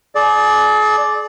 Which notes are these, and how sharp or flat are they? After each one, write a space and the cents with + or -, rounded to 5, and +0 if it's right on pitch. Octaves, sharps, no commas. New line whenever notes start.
G#4 +40 D5 +0